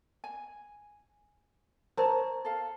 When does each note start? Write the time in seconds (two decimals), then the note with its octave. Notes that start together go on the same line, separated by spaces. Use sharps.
0.24 G#5
1.98 A#4 C5 C#5 A5 A#5
2.45 A4 F5